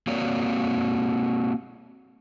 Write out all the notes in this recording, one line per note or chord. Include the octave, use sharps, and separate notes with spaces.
A#3 C4 F#4 C#5 D5